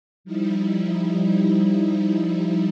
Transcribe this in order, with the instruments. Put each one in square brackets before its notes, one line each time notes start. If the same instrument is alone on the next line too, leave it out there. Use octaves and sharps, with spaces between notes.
[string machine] F3 G3 D#4 E4